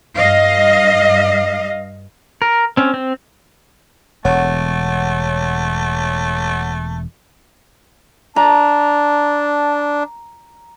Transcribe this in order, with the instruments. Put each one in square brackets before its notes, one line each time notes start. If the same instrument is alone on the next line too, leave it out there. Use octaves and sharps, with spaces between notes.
[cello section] G2 D#5 F5
[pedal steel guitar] A#4
C4 C#4
C4
[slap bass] E1 [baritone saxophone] A3 [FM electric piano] C#5 F#5
[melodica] D4 [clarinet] A5 [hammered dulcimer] A#5